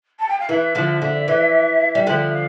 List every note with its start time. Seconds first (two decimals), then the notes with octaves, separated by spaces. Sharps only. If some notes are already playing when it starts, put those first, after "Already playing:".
0.19 A5
0.28 G5
0.39 F5
0.49 E3 E5
0.75 D3 F3
1.02 D3
1.28 E3
1.95 G3
2.06 D3 F3 E5
2.33 F5